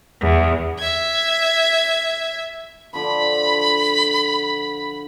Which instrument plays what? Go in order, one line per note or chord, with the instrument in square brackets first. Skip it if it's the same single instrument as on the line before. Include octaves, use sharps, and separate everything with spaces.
[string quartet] E2
[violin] E5 G#6
[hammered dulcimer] D3 F3 [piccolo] B5